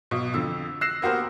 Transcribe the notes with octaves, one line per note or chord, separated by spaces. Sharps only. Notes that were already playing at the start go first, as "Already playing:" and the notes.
B1 B2
F2 D3 E6
E6 F#6 A#6 C7 E7
A#3 B3 F#4 G4 A#4 C5